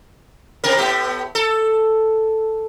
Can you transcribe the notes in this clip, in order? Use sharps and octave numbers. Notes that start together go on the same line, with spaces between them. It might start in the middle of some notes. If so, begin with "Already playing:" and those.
C3 C4 A#4
A2 B3 G4
A4